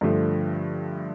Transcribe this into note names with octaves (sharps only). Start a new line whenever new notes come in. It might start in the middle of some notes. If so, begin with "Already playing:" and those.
G2 D3 F3 A3